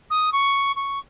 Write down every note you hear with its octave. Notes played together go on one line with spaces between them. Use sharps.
D#6
C#6
C#6